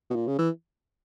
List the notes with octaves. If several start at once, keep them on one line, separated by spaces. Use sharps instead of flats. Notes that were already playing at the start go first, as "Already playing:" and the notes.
B2
A#2
C#3
E3